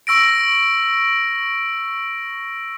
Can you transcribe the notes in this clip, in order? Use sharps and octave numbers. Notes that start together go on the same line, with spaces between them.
C#6 E6 A#6 D7